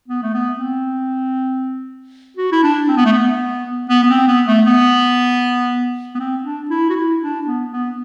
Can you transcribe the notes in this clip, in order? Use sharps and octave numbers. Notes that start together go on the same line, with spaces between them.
B3
A3
B3
C4
F#4
E4
D4
C4
B3
A3
B3
B3
B3
C4
B3
A3
B3
B3
C4
D4
E4
F#4
E4
D4
B3
B3